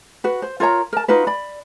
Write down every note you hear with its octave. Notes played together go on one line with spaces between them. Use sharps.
F#4 B4
C5
F4 A#4 C#5 A#5
A#4 A5
D#4 F4 F#4 B4
D5 B5